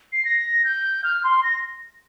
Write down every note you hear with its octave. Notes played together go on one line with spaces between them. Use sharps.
C7
A#6
G6
F6
C6
A#6